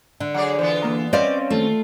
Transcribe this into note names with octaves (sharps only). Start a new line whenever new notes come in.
D3
F#3 G#4 D5 F#5
E3 B3 F4 C5
E2 A#3 A#5
C4 C#4 B4 D5 D#5 F5
D#2 A3 F4